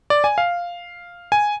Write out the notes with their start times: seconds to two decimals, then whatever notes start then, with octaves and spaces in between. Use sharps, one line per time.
0.10 D5
0.24 G#5
0.38 F5
1.32 G#5